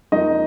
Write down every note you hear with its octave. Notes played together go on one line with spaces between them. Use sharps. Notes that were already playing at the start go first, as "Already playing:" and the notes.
F2 F3 A#3 D#4 D#5